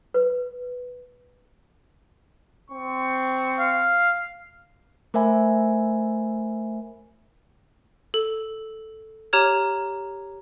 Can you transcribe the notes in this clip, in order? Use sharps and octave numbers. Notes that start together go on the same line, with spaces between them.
B4
C4 C#6
F5
A3 A#4 C5 E5 G#5 B5
A4
G4 C#5 A#5 F6 G#6